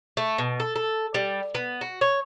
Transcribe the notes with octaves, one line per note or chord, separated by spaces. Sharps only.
A3
B2
A4
A4
G3
B3
F#4
C#5